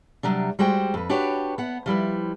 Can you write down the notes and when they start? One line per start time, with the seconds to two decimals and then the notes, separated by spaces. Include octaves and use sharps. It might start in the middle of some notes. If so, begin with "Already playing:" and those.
0.23 C3 F#3 G3 D4
0.59 G3 G#3 F#4 C5 G5
0.94 F2 B4
1.09 D4 F#4 G4 B4 C#5
1.58 B3 F#5
1.86 F3 G3 E4 B4